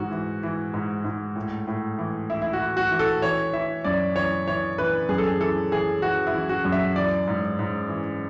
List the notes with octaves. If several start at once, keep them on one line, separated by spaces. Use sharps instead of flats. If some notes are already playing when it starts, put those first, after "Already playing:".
Already playing: G#2 E3 F#4
E3
E3
G#2
G#2
A2
A2
E3
E3 E4
E4
F#4
E3
F#4
E3
A4
E3 C#5
E3 E5
F#2 D5
E3 C#5
E3 C#5
E3 B4
F#2 G#4
A4
G#4
E3 A4
E3 G#4
E3 F#4
E4
E3
F#4
F#2
E5
E3 D5
G#2
G#2
E3